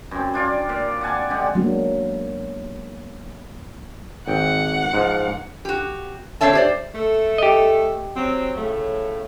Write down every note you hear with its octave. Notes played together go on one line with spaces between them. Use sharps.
F#2 C4
D4 F4 D5
A#2
D5 F#5 G#5 A5
D3 G#3 G4 F#5
F#3 G#3 A#3 B3 D4 F#4
G#1 F#5 G5
G#2 F3
F#4 G4
A3 C4 D4 C#5 E5 A5
G4 C5 D5
A3 A4
G4 D#5
F#3 C4
A2 C#3 A3